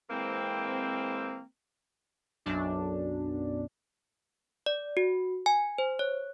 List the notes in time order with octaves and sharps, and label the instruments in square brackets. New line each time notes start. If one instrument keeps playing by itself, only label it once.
[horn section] E3 G#3 A#3 C4
[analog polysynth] B1 F#2 D4
[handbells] D5
F#4
G#5
C5
C#5